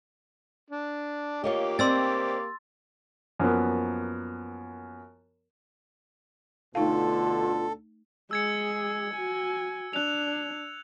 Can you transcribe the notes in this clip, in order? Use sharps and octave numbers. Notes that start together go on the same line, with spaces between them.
D4
A#3 F4 G4 C#5 D#5
C4 D5 D#5 C6 E6 A6
F#2 F3 A#3 B3
D2 B2 D3 A3 D#4 F4 A4 F5
G#3 G#4 E6 G#6 C#7
F#4 G#5
D4 F#6 F7